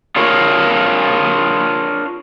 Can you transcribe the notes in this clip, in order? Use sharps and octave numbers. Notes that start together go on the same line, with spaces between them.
D4 F4 A#4 C#5